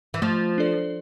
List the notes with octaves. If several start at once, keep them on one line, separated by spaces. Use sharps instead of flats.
E3
F3 A3
D4 A4 D5